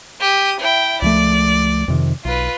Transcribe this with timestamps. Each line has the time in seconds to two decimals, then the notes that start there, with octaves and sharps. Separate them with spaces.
0.21 G4 D#6
0.60 E4 G5
1.02 C#2 F3 A3 D5
1.88 F2 C3 D#3
2.25 B1 F4 B4